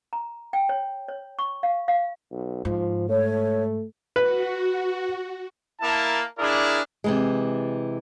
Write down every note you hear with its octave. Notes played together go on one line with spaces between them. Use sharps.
A#5
G5
C#5
C#5
C#6
F5
F5
B1
G#2 F3
A3 C#5
F#4 B4
A#3 E4 A#4 A5
D4 E4 G#4 A#4 D5
C3 E3 G#3